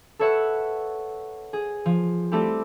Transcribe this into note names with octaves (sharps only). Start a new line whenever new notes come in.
A4 B4 C#5 E5 F#5
G#4
F3
G3 A3 C4 E4 G4